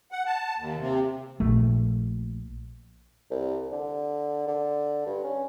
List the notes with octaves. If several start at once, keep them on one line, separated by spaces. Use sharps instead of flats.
F#5
A5
D#2
C3
A#1 A3
C2
D3
D3
G2
C#4